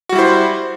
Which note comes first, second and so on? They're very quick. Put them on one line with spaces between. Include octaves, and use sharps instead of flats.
F#4 G3 E4 C5